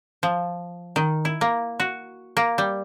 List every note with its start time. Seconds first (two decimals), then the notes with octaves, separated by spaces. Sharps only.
0.23 F3
0.96 D#3
1.25 E4
1.41 A#3
1.80 F#4
2.37 A#3
2.58 G3